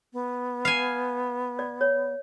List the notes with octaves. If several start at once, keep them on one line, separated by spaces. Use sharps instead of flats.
B3
F5 G#5
D5
C#5